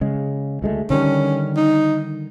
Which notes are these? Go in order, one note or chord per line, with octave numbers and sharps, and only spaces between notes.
C#3 G#3
D2 G#3 A3
D3 D#3 G3 C#4
D#4